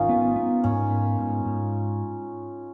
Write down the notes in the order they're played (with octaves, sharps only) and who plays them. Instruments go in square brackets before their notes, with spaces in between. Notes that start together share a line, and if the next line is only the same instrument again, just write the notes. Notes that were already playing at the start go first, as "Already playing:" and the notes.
Already playing: [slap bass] G#1 [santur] C#4 D#4 F4 A#4
[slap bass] B3
B3
[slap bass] G#2 [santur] C#4
[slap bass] B3
G#2
G#2